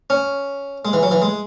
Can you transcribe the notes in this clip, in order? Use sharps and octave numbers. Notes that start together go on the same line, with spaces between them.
C#4
G#3
E3
F#3
E3
G#3